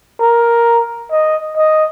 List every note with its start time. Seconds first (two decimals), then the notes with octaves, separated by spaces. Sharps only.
0.20 A#4
1.11 D#5
1.57 D#5